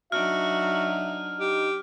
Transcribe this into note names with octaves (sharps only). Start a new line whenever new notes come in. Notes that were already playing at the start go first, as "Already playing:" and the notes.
F#3 D4 D#4 F#4 E5 F6
D#4 G4